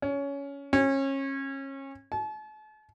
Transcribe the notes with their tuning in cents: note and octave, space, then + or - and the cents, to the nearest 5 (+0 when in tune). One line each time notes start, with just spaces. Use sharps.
C#4 +15
C#4 -30
A5 -40